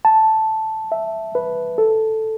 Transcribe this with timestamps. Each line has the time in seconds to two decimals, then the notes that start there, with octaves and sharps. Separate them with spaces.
0.05 A5
0.92 E5
1.35 B4
1.78 A4